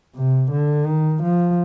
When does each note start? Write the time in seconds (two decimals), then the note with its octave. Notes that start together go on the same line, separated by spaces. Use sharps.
0.15 C3
0.51 D3
0.87 D#3
1.23 F3